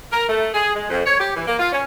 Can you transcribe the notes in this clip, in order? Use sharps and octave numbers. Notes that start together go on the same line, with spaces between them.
A#4
A3
G#4
G#3
F2
C#5
G4
E3
A#3
F4
C#4